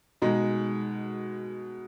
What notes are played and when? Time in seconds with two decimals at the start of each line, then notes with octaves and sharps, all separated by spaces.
0.22 B2 G#3 D#4